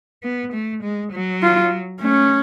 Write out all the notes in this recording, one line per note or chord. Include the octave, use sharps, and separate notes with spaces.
B3
A3
G#3
F#3
F4
A3 C#4